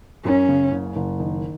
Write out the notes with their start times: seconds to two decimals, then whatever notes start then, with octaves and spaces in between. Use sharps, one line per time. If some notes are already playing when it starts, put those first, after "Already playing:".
0.25 F#2 C#4
0.49 C#3
0.72 F#1
0.96 F#1
1.20 D#3